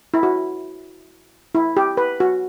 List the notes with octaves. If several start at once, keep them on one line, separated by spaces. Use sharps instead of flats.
E4
F#4
E4
G4
B4
F#4